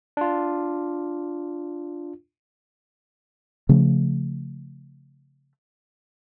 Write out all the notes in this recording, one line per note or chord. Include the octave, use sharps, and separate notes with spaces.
D4 F4
C#3 F3 A3